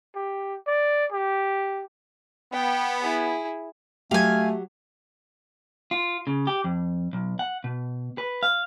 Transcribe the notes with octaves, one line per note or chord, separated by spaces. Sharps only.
G4
D5
G4
B3 G5
E4 G#4
F#3 A3 G4 F5 G#5
F4
C#3
G4
F2
B1
F#5
B2
B4
F5